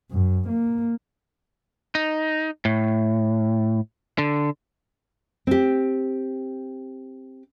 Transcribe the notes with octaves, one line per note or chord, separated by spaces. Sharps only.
F#2
A#3
D#4
A2
D3
C4 G4